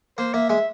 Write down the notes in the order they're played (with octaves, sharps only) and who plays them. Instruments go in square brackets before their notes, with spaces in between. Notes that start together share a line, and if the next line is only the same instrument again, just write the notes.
[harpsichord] A#3 [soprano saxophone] C5
[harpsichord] A#3 [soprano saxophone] E5
[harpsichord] G#3 [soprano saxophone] E5